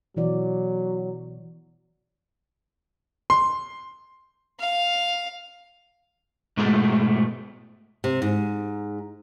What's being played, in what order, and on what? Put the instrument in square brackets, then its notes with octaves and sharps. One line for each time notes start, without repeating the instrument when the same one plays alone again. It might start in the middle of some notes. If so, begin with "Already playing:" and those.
[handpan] B2 E3 D5 [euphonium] F#3
[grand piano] C6
[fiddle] F5
[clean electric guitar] G#2 B2 G#3 A3
[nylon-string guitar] C3
G#2